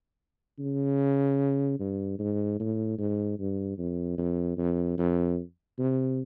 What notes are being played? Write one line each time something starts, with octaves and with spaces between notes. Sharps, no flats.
C#3
G2
G#2
A2
G#2
G2
F2
F2
F2
F2
C3